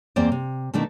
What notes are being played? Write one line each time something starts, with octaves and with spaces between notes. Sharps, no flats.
E2 A#3 C4 C5 D5
C3
B2 D#3 A3 D4 E4 A#4